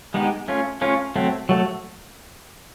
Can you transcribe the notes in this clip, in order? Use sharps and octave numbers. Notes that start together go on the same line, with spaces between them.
G#3 B3 D#4 G4
A3 C#4 F4
A3 C#4 F4
F#3 A3 C4
F#3 A3